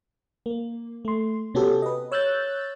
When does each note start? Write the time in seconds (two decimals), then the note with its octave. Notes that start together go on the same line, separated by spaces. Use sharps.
0.46 A#3
1.05 A3 C6
1.54 C3 B3 C#4 F#4 G4 A4
1.82 B4 D#5
2.12 C#5 E6 F#6 G6 A6